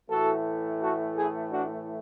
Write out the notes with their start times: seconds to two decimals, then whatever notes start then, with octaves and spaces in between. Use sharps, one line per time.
0.10 A2 E3 A3 F#4 A4
0.81 F#4 A4
1.16 E4 G#4
1.51 D4 F#4